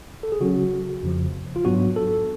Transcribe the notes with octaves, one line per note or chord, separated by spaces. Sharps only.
A4
G#4
C#3 F#3 C#4 F#4
F2 C#3 F3
F4
G#2 F#3 B3 D4 F#4
A4